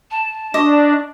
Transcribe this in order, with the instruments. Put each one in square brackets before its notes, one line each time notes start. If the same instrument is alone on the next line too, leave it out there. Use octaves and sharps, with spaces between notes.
[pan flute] A5
[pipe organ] D4 [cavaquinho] D#5 [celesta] C#6 D6